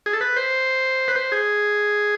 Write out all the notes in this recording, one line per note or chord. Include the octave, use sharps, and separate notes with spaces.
G#4
A4
B4
C5
B4
C5
G#4